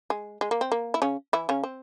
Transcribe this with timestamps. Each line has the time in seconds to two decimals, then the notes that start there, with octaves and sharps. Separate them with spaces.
0.10 G#3
0.41 G#3
0.51 A#3
0.61 C4
0.72 A#3
0.94 E4
1.02 C#3 C#4
1.33 E3 E4
1.49 C#3 C#4
1.64 C4